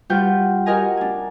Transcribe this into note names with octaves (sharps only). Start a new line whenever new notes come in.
G3 F4 F#4 B4 G5 G6
F#4 G4 A#4 D#5 G#5 A#5
D4 G#5